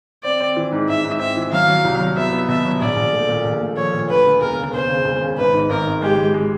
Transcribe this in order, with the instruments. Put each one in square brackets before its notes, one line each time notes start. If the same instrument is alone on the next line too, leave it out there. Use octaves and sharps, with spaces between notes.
[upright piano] C4 [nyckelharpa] D5
[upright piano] C4
E3
G#2
[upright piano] G#2 [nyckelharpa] E5
[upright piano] G#2
[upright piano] C4 [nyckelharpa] E5
[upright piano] E3
[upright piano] F#3 [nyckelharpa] F5
[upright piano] F#3
C2
F#3
[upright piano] B3 [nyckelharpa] E5
[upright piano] B3
[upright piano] B2 [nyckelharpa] E5
[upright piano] F#3
[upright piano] A#1 [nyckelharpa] D5
[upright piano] A#1
A3
A#2
A#1
A3
[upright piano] F3 [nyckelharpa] C#5
[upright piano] A#2
[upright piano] D2 [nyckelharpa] B4
[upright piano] D2
[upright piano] E1 [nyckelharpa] A#4
[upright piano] C#3
[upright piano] E1 [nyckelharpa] C5
[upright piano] C#3
E1
C#3
[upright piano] G#1 [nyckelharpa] B4
[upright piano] G#2
[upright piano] G#1 [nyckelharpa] A#4
[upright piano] G#1
[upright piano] G#3 [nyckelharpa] G4
[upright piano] G#3
G#3